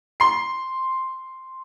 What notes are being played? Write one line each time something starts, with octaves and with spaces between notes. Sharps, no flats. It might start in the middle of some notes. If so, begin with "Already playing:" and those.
C6 C7